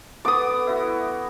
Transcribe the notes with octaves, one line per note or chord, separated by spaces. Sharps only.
D3 B3 D6 D#6
E4 F#4